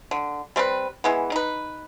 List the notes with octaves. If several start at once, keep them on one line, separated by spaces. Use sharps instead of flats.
D3
G3 C4 A4 B4
E3 G#3 B3
D#4 B4